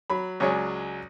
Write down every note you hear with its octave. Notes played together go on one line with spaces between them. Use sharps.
F#3 B5
C#2 F#3 G#3 C#5 D5